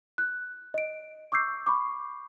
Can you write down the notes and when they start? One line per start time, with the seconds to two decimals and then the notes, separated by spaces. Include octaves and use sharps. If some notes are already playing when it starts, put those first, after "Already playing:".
0.18 F#6
0.74 D#5 D7
1.32 C#6 D6 E6 G6 C7
1.66 B5 C#6 D6